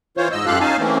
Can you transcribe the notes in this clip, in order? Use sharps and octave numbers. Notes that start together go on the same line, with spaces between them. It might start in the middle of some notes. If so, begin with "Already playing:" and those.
E3 F4 C5 C#5
G#2 D#5 E6
F#2 F4 G4 A4 F5 F#6
C#4 D#4 F5 G#5 A5
E3 A3 A#3 C4 C#4